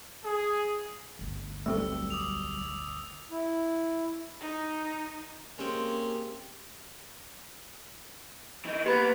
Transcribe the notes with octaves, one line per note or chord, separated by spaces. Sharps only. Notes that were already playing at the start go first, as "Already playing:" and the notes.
G#4
G1 D2
B1 G3 A3 C4 A4 E6
D6 D#6 F7
E4
D#4
G#3 A#3 C4 C#4 G4
E3 D#4
A#3 B3 G4 B4 B5 A6